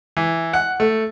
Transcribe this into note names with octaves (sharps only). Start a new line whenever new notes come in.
E3
F#5
A3